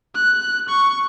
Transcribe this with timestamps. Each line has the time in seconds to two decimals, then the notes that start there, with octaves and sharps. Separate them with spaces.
0.15 F#6
0.69 C#6